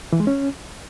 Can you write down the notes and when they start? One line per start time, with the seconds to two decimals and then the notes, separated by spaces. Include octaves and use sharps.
0.12 E3
0.20 G#3
0.27 C#4